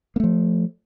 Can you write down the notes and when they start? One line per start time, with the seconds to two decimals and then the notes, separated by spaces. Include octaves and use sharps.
0.16 A#3
0.20 A3
0.24 F3